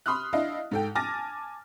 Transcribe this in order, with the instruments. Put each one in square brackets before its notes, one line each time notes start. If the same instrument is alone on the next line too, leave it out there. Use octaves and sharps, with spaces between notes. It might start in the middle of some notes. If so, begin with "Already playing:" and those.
[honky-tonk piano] B5 C6 D#6 F6 F#6
D4 E4 D#5 F5
G#2 A4 G5
G#5 A5 D6 F6 A6 A#6